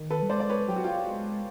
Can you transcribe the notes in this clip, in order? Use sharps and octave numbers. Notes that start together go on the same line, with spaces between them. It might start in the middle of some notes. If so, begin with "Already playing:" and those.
Already playing: D#3
A4 B4
G3
G#3 C5 D5
D5
B4 C#5
F#3 G4
F#4
F4 G4
G#3